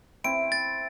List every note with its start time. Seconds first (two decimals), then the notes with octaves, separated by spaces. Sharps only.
0.24 C4 E4 D7
0.52 A6